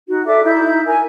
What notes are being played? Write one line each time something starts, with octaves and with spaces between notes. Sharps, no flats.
D#4 F#4
A4 D5 E5 D6
D#4 E4 E5 G6
A#4 G#5